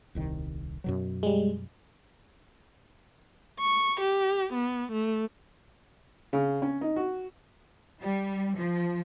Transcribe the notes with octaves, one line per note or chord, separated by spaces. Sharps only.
D#1 C2 D#3
F#2 B2 F#3
G3 G#3
C#6
G4
B3
A3
C#3
C#4
D#4
F#4
G3
F3